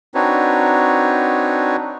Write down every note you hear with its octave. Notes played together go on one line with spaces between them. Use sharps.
C4 D4 D#4 F#4 B4 C#5